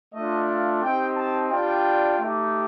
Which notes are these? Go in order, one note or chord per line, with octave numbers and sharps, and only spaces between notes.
A3 D4 F4 D#5
F5
C4 D#4 G4 G5
A5
G3 D4 F4 G5
A3 D#4 G4